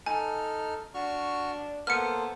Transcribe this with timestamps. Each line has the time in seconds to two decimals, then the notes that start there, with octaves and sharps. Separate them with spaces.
0.06 D#4 A4 G#5 F6
0.94 D4 F#4 C#6 F6
1.87 A#3 B3 A4 C5 F6 C#7